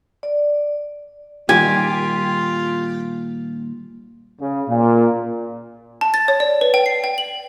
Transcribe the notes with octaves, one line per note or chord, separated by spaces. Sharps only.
D5
A#2 D#3 G3 F4 G4 G#5
C#3
A#2
A5
A6
C#5
D5
B4
G5
C7
G5
F#7